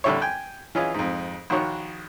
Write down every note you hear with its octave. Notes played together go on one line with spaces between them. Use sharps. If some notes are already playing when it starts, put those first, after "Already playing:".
A1 D3 G3 E4 C#5
G5 G#5
E3 C#4 F4 G#4 D#5
F2 G#2
A#1 D#3 F#4 C#5